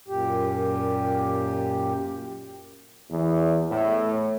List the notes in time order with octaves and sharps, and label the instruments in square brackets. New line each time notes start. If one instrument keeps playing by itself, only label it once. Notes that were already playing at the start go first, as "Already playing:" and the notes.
[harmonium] F#2 A#2 G4
[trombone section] E2
A2